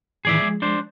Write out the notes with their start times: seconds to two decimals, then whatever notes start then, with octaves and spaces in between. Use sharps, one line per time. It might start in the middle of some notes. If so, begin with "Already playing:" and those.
0.25 A2 D#3 E3 G#4 D5 E5
0.40 F3 G#3
0.62 D4 C5